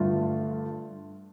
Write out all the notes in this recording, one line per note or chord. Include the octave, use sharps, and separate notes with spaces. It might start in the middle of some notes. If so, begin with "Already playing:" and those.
Already playing: G2 D3 A3 F4